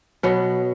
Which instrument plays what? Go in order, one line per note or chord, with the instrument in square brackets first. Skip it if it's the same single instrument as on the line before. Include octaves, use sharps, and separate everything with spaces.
[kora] B2 F#3 B3